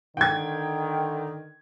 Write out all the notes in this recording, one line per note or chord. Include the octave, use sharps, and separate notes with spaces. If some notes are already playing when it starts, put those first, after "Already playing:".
D3 D#3 G5 G#6